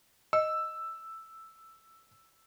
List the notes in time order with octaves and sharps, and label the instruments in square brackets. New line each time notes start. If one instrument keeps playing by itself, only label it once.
[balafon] D#5 [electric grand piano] E6